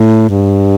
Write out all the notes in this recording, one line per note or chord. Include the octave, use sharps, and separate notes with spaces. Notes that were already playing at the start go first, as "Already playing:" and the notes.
Already playing: A2
G2